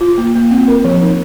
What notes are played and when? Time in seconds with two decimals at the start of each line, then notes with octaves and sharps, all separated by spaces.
0.01 F4
0.18 A#3
0.35 A#3
0.51 C4
0.68 A#4
0.85 F3
1.02 D#4